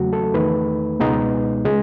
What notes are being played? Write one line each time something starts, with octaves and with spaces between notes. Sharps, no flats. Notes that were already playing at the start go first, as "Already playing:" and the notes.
Already playing: E2 C#3 F#3 A3 F#4
A4
E2 D#3 A3 D#4 B4
C#2 B2 G#3 B3 D#4
C#3 G#3